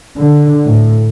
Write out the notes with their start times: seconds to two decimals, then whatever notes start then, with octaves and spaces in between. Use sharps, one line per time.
0.18 D3
0.67 A2